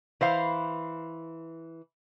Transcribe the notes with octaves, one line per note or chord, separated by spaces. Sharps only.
E3 C5 F5